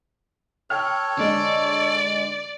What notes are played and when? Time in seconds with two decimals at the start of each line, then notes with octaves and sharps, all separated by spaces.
0.70 A4 C#5 G5 F6
1.18 D3 G#3 D5